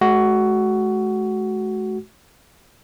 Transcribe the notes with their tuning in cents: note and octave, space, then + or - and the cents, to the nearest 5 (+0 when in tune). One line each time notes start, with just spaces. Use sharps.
G#3 +45 F#4 +10